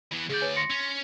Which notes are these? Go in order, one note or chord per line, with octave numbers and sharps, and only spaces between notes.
E3 B3
D2 G#4 D5 G6
B4 C#5 G#5
C6 A#6 C#7
C#4